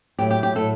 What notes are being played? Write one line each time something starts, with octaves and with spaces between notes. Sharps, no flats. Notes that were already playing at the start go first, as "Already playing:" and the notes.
A2 F#3 A3 G4
G4
G4
A2 F#3 A3 A4